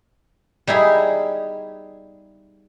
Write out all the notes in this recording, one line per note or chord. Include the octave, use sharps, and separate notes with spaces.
G3 D#4 E4 G#4